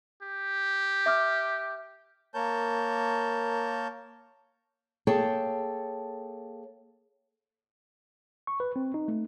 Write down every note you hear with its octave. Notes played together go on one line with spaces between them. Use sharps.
G4
E5 D6 F6
A#3 A#4 C#5 A5 G6
A#3 G#4 A4 C#5 G5 A5
C#6
B4
C4
D#4
A3